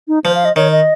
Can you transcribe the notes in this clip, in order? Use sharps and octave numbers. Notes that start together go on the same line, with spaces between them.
D#4
F3 C5
F5
D#5
D#3 C#5
D#5